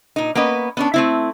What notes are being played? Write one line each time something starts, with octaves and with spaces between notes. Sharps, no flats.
A#2 D#4
A#3 B3 C#4 B4 D#5
B3 C#4 D4
A3 C4 E4